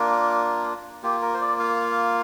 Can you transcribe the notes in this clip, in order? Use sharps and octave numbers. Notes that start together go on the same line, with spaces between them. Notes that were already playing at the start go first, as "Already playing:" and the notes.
Already playing: A#3 D4 F4 A#4
A#3 F4 G4
A#4
C5
D5
F5